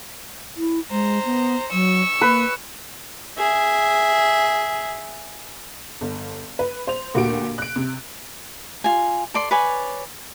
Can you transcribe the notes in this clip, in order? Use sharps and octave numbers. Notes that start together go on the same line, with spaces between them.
E4
G#3 C5 A#5
B3
F#3 C#6 E6
A#3 B4
G#4 E5
G1
B4
C5 F7
D2 A#2 F#4 G4 D7
F#6 D7
C3
F4 G#5
A4 D5 C6
B4 C#5 D5 G#5